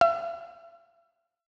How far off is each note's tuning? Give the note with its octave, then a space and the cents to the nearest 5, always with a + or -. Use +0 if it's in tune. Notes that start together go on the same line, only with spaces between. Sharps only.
E5 +40